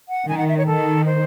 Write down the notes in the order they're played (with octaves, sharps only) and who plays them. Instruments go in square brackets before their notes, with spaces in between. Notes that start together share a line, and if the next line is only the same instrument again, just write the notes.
[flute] F#5
[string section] D#3 [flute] G#5
[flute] F#5
E5
C#5
[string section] D#3 [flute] A4
[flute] C5